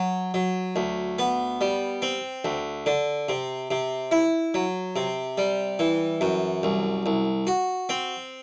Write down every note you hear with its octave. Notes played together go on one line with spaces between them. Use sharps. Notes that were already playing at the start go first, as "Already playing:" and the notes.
Already playing: F#3
F#3
D2
B3
G3
C4
D2
D3
C3
C3
E4
F#3
C3
G3
E3
F#2
C2
C2
F#4
C4